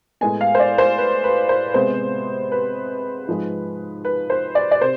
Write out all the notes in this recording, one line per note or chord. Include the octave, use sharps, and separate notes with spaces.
A2 G#3 B3 G#5
F5
C5
D5
C5
B4
B4
C5
C3 G#3 B3 C5
B4
G#2 F3 G#3
B4
C5
D5
D5
C3 C5